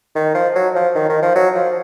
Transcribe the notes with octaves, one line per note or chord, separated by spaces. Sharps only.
D#3
F3
F#3
F3
D#3
D#3
F3
F#3
F3